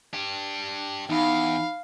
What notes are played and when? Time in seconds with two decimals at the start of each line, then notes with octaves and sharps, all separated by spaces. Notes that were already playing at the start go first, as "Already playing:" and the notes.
0.13 D4 G4
1.09 E2 D#4 F5 B5